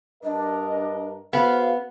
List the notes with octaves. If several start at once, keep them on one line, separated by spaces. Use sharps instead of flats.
G2 D4 A#4 D#5
B3 F#4 G#4 C5 F5